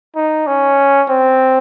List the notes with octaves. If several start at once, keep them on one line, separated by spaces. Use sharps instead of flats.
D#4
C#4
C4